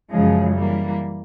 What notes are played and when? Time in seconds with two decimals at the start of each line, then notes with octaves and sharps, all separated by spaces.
0.11 F#2 C#3 F3 G#3
0.56 E3 G3 A#3